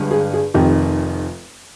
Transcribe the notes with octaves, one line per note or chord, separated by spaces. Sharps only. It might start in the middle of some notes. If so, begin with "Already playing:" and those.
Already playing: G1 G2 G#3
G#4
G#4
F1 F2 D#3 G4